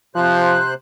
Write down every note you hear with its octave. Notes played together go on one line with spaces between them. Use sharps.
C3 F3 C5 F#6